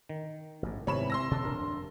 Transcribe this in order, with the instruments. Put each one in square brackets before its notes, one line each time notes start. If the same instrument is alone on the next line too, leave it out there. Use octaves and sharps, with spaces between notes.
[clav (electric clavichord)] D#3
[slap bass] A1 G#2
[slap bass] G#2 D#3 B3 [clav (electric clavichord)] C3 E3 [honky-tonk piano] C#5 B5 E7
[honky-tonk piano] C6 E6 A#6
[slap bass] B2 [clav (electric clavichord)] A4 D5
[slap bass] F1 D#2 D4 [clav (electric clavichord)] A#4